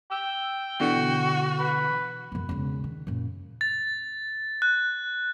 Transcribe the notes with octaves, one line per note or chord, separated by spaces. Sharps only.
G5 E6
B2 D3 E3 F#4
B4
F#2 B2
E1 C#3
D#3
F#2 A#2
A6
F#6